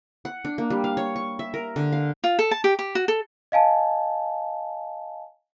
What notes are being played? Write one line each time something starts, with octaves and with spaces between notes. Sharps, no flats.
F#5
D4
A#3
G3
F5
C#5
C#6
E5
A#4
D3
F5
F4
A4
A5
G4
G4
F#4
A4
D#5 F5 G#5 A5